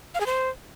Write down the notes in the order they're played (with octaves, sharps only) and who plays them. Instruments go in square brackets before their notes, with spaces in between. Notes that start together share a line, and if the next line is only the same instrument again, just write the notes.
[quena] F5
G#4
C5